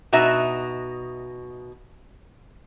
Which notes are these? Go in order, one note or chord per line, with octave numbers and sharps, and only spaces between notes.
B2 D#4 F#4 E5